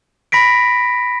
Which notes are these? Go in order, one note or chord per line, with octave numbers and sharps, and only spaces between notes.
B5 A#6 B6 D7